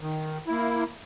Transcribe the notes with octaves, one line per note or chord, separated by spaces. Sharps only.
D#3
A#3 E4